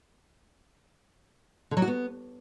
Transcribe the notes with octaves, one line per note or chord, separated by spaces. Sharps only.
D3
F#3
F#4
B3